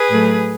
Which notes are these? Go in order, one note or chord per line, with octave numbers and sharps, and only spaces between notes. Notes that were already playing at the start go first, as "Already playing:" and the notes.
Already playing: G#4 B4
A2 F#3 A3